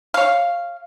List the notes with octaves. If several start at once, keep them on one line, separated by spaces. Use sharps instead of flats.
C#5 F5